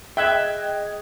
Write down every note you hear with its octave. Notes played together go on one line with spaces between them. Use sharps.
G#4 D#5 E5 G5 F#6 G#6